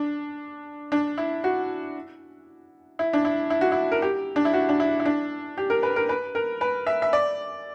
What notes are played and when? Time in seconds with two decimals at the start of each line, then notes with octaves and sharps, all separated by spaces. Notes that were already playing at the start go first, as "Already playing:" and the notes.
Already playing: D4
0.92 D4
1.18 E4
1.44 F#4
2.99 E4
3.13 D4
3.25 E4
3.50 E4
3.61 F#4
3.72 E4
3.92 A#4
4.02 G4
4.36 D4
4.45 E4
4.54 F#4
4.69 D4
4.80 E4
5.00 E4
5.05 D4
5.57 G4
5.70 A#4
5.83 B4
5.96 A#4
6.09 B4
6.35 A#4
6.61 B4
6.87 E5
7.02 E5
7.13 D5